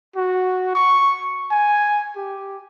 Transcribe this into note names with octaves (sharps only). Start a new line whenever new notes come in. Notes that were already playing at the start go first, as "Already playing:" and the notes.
F#4
C#6
G#5
G4